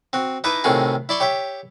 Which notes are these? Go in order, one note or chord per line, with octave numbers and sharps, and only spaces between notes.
C4 F#4
D#4 E4 B4 D#5 A5 D6
A2 C3 D#3 F4 F#4 G#4
E4 D5 C6 C#6
G4 C#5 E5 G5